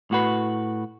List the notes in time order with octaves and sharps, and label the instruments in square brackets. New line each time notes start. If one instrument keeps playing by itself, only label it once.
[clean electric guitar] A2 F#4 B4